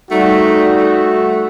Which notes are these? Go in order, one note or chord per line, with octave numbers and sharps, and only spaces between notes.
G3 A3 D#4 F#4
A3